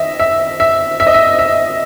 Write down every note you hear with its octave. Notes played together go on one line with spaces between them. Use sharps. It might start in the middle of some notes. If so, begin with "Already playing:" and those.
Already playing: D#3 D#5 E5
E5
E5
E5
D#5
E5
E5